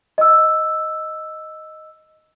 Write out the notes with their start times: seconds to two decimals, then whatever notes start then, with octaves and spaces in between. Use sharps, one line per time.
0.18 D#5 E6